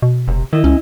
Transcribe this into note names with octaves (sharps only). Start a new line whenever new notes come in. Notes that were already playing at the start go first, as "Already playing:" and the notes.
B2
F1 C3
D#3 E4 D#5
C#2 C#4